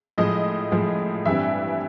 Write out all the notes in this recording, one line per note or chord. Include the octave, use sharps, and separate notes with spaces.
A2 F3 G#3 D#5
A2 F3 G#3
G2 E3 G3 C4 E5